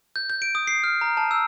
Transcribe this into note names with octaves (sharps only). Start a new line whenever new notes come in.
G6
G6
D7
D#6
C7
F6
A#5
A5
E6